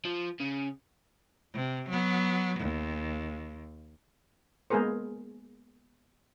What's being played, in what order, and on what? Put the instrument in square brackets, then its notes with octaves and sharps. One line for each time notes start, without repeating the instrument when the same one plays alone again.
[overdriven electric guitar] F3
C#3
[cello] C3
F#3 B3
D#2
[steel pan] G#3 A#3 B3 G#4 A#4 C5